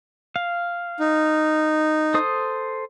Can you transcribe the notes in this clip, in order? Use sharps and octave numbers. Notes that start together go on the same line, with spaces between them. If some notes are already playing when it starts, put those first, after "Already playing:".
F5
D#4
A4 C5 D#6